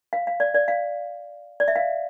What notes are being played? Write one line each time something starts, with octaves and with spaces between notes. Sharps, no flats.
F5
F5
D5
D5
F5
D5
E5
F5